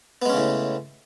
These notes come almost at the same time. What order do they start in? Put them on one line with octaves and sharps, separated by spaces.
B3 G#3 C#4 C#3 A2